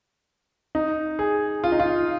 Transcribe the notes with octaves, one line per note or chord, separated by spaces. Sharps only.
D#4
G#4
F4
D#4
F4